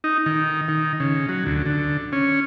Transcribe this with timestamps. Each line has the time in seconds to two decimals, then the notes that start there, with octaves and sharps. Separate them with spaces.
0.04 D#4
0.26 D#3
0.68 D#3
1.00 C#3
1.29 F#3
1.46 D2
1.66 D3
2.12 C#4